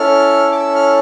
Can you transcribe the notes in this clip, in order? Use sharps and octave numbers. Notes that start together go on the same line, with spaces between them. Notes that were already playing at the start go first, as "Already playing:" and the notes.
Already playing: C#4 E4 A4 F6
D6
E6
F6